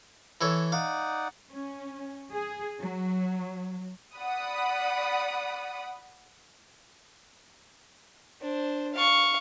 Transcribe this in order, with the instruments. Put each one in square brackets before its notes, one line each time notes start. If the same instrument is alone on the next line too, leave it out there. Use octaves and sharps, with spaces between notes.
[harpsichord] E3 A4 C#5
[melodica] D#4 D5 F#5 [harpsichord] F5
[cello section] C#4
G#4
F#3
[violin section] D5 F#5 B5 D#6
[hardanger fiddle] D4 C5
F5 C#6